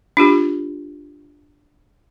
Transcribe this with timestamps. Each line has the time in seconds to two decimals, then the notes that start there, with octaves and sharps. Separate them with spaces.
0.17 D4 F4 G4